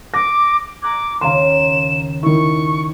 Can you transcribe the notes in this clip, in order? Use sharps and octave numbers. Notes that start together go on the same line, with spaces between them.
D6 A#6
A#5 D6 F#6 G#6
D#2 C#3 F5 A#5 C6 E7
D#3 E4 C#6